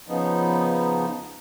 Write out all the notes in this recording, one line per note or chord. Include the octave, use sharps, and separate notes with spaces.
C#3 F3 B3 D#4